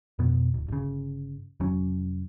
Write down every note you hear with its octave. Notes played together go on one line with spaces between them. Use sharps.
F2 B2 B3
D1
G1 C#3
F1 F#3 C#4